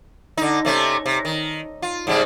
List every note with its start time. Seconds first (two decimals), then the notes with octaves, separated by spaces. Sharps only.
0.37 D3 D#4
0.65 C3 A3 C#4
1.06 C3
1.25 D#3
1.82 F4
2.07 G#2 C#3 G3